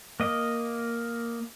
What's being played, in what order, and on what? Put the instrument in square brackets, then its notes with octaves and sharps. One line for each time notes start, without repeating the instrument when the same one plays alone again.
[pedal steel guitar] A#3 D#5